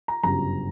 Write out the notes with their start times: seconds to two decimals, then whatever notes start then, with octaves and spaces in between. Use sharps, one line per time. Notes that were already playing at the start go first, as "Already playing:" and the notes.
0.08 A#5
0.23 G1 F#2 C#3 G3 A#5